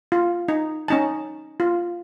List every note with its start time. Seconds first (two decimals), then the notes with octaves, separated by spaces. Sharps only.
0.12 F4
0.48 D#4
0.88 C#4 D#4 A5
1.60 F4